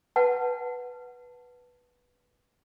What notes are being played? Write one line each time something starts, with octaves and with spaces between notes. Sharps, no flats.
B4 F#5 A5